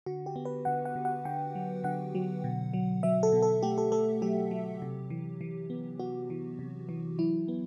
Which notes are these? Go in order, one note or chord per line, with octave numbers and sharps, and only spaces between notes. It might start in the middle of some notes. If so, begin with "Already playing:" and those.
D3 F#4
G4
B3
B4
D3 F#5
F#5
D3
F#5
D3 G5
F#3
D3 F#5
F#3
B2
F#3
F#3 E5
A4
B2
A4
A3 G4
A4
A3 A4
F#3 G4
F#3
C3
E3
E3
B3
B3 F#4
E3
C3
E3
F#3 E4
B3